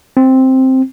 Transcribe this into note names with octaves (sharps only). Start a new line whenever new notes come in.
C4